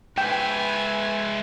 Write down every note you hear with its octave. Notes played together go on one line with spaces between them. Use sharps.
G#3 B4 E5 G5 G#5